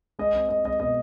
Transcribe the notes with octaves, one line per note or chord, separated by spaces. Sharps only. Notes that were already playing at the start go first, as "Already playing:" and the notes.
G#3 D#5
C4
G#3 D#5
G#3 D#5
B2 D#5